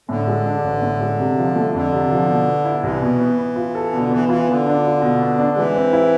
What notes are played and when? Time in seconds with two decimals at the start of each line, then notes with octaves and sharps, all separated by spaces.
0.09 A2 D3
0.28 G#3
0.46 D4
0.65 A1
0.82 A2
1.00 G#3
1.19 C3
1.38 F3
1.56 A3
1.73 F2 D3
1.92 C3
2.11 F3
2.28 B2
2.47 B3
2.65 E4
2.83 C2 E3
3.02 B2
3.19 B3
3.38 B3
3.56 F4
3.75 A4
3.93 B2 D3
4.11 E3 B3
4.29 E3 F4
4.47 D3 B3
4.66 D4
4.84 F4
5.02 B2
5.21 B3
5.39 D4
5.56 E3 G#3
5.76 C4
5.93 E4